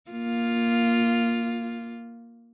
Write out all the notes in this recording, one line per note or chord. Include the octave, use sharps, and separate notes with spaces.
A#3 F4